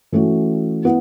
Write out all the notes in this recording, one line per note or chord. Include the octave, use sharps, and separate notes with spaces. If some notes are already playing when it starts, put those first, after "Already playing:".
E3 A3 C#4 F#4
B3 E4